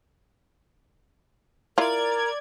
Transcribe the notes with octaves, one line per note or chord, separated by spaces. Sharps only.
E4 F4 A#4 D5 A#5 G#6